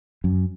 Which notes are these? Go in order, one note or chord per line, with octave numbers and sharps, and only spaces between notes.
F#2